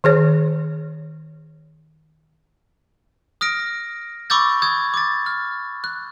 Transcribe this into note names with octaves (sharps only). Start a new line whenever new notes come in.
D#3 G#4 C#5
D#6 F6 A#6 D7
B5 C#6 D6 E6 G6 A6
D#6 G6 G#6
D6 A6
F6
F#6